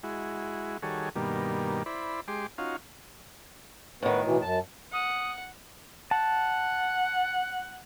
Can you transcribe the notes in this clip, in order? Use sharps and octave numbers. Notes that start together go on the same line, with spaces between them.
G#3 E4 F#4
D#3 G3 F#4 G#4 A4 C#5
G2 B2 D#3 G3 A#3
E4 C5 D5 B5
G#3 G4 C6 D6
C#4 D#4 F4 F#4 F5
A2 D#3 B3 F#4 B4
B2 E3
F#2 A5
F#5 D#6
F#5 A5